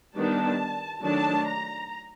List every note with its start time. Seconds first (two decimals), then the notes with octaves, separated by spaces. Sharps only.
0.16 D#3 G3 B3 D4 A5
1.03 D#3 F#3 A3 D4 A5
1.48 A#5